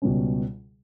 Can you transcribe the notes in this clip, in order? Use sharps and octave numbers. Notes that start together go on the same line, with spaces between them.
C#2 B2 G3 C#4